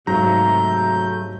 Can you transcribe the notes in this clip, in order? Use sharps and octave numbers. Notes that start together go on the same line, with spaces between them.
G#2 C3 F#3 A3 F5 A#5 G6